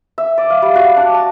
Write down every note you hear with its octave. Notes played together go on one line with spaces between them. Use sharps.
E5
D5
F5
G3
F#4
D4
A5